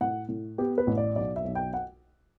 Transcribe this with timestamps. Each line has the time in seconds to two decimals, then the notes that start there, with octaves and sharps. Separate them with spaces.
0.01 A2 F#5
0.29 A2
0.58 B3 G4
0.78 B4
0.87 A1
0.97 D5
1.16 B1 D5
1.36 E5
1.45 B1
1.55 G5
1.74 F#5